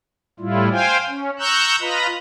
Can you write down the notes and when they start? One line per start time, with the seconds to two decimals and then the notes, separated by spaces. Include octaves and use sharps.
0.40 A2 G3 E4 F4
0.72 C5 F5 G5 G#5
1.09 C#4
1.39 A#5 C#6 E6 F#6 G6
1.81 F4 B4 D#5 A#5 B5